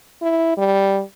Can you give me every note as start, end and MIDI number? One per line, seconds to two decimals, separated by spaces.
0.22 0.55 64
0.57 1.01 55